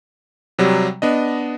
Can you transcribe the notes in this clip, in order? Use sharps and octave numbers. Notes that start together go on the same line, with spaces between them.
C3 F#3 G3
B3 D4 D#5